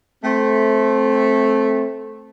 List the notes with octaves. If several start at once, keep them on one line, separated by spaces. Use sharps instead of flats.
A3 C4